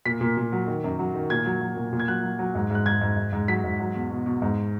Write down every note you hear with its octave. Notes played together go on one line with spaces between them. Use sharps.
A#2 B6
A#2
A#2
F#3
D#3
F#2
F#3
D#3
A#2 G#6
F#3
F#3
A#2
A#2
G#6
F#3 F#6
F#3
F#3
G#2
G#2 F#6
G#2 G#6
G#2
G#2
G#2
F#3 B6
G#2
F#3
E2
B2
B2
G#2